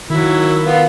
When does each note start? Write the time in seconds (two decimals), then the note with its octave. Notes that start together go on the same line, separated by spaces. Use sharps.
0.10 D#3 F#3 E4
0.64 B3 F4